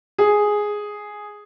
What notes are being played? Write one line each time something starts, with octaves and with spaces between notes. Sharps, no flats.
G#4